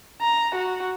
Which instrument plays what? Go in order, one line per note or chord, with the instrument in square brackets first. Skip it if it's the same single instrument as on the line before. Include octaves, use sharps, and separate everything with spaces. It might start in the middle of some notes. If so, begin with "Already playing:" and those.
[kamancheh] A#5
F#4